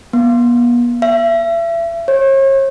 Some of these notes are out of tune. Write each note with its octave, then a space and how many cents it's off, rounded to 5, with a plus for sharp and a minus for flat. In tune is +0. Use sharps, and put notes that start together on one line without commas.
B3 -45
E5 +35
C#5 -40